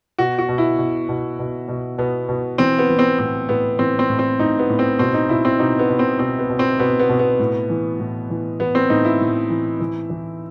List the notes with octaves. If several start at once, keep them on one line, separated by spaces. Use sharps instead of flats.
B2 F#4
F#4
B2
E4
B2
B2
B2
B2
B2 B3
B2
E3 C4
B3
E3
C4
A2 C4
A2 B3
E3 C4
C4
A2
C4
A2 D#4
B3
A2
C4
B2 C4
D#4
B2 E4
C4
B2 D#4
B3
B2
C4
B2 C4
B3
B2
C4
B2 B3
B3
B2
B3
A2
E3
A2
E3
E3 B3
C4
A2 D#4
E4
A2
E3
E3
E3